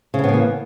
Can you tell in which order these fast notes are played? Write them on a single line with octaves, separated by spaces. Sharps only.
C#3 A2 B3 A#3 E3